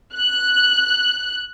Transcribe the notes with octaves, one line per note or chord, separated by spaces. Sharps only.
F#6